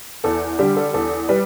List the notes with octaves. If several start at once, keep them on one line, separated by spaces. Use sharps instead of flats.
E2 A4
D3 G3 G4
A4
E2 A4
G3 B4